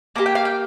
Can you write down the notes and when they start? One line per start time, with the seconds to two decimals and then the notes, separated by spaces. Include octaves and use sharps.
0.16 A#3 D#4 G4 A#5
0.26 G5
0.35 F5
0.45 G5